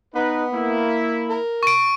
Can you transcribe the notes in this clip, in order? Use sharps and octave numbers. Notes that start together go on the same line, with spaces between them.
B3 D#4 B4
A#3 E4
A#4
C#6 D7